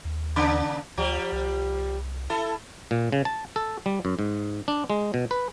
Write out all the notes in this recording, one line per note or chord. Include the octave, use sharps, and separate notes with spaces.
D#2
C#3 A#3 D4
D2 F3 G3
C2
E4 A4
A#2
C#3
A5
A4
G3
F#2
G#2
D4
G#3
B2
B4